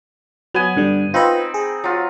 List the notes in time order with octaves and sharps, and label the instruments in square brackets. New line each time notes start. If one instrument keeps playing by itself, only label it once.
[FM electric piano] F#3 [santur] B3 G#5
[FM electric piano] G2 D3 G3
[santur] C4 D#4 B5 [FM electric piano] F4 B4
[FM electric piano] G#4
[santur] F#3 F4